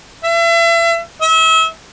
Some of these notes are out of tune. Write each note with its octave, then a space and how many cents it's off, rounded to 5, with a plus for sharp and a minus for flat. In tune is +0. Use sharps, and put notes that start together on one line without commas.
E5 +35
E5 -35